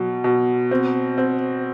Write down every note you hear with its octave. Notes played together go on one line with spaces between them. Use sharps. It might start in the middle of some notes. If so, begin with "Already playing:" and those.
Already playing: B2 F#3
B2
C4
C4